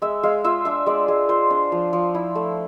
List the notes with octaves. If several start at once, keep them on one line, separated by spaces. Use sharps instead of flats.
G#3 E5
G#3 F5
F4 E5
D4 E5
G#3 D5
G#3
F4 C5
D4
F3
F3
E4
A3